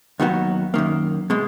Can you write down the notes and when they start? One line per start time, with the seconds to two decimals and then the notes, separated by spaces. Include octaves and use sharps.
0.20 D#2 D#3 F#3 B3 F#4
0.74 F#2 D#3 A#3
1.30 B2 G#3